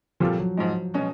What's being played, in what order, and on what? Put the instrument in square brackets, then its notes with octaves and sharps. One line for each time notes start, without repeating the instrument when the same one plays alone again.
[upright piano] A#2 G3 C4 F4 A4 [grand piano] F3
[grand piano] F#3
[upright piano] G#2 F3 G#3
B2 G#3 C#4 F#4